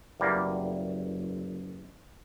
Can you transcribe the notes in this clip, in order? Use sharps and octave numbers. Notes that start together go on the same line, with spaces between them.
F#1 E2 G3 A#3